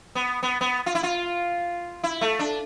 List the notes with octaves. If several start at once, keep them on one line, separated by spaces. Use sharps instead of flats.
B3
B3
B3
F4
E4
F4
E4
A3
D4